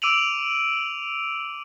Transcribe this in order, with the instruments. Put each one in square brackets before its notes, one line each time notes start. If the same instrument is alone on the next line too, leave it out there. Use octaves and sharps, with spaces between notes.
[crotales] D6 E6 D7 D#7 F7 F#7